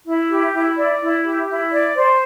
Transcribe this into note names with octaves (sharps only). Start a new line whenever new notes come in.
E4
G4
E4
D5
E4
G4
E4
D5
C5